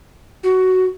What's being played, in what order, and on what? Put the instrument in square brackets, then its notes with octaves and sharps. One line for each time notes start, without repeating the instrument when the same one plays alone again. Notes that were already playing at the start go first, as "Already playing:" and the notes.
[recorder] F#4